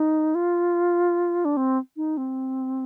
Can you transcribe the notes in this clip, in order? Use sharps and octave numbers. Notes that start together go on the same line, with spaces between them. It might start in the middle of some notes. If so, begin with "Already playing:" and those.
Already playing: D#4
F4
D4
C4
D#4
C4